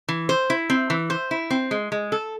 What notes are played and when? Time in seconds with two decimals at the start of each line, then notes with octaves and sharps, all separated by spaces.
0.09 E3
0.29 C5
0.50 E4
0.70 C4
0.90 E3
1.10 C5
1.31 E4
1.50 C4
1.71 G#3
1.92 G#3
2.12 A4